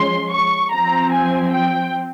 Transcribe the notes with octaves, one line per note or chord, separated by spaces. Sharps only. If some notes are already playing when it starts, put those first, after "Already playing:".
Already playing: F3 G#3 C#4 C6
C#6
F3 C4 A#5
G#5
G5